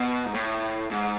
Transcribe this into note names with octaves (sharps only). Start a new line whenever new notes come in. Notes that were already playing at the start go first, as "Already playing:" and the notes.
Already playing: B2
G#2
A2
G#2